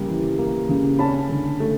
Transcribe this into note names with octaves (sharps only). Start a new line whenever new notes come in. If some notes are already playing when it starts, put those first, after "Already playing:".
Already playing: C#3 G3 A#3
E3
A#3
C#3
C#4 A5 B5
D3
A3